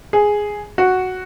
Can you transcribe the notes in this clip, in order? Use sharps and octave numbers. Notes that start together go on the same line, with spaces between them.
G#4
F#4